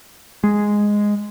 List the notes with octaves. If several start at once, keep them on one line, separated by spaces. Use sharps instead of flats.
G#3